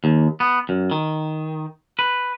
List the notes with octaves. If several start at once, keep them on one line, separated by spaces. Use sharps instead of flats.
D#2
B3
F#2
D#3
B4